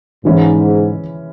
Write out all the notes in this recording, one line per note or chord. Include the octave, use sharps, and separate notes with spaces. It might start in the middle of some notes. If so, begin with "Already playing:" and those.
G#2 E3 G#3 C#4 E4